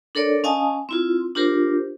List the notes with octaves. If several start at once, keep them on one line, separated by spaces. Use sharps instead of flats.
D4 A4 A#4 C#5 D5
C#4 D#5 F5 G#5 A5 D#6
C4 E4 F4
D4 F4 G4 A#4 C5